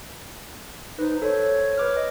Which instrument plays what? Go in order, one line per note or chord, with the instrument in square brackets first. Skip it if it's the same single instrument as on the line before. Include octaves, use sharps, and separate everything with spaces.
[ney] D#4 [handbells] B4 C5
[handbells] A4 C5 [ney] C#5
[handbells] B4 D6 F6
D#5